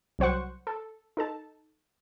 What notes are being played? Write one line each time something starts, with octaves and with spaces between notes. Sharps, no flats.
C2 F#3 C5 F#5 C#6
A4
D#4 A4 A5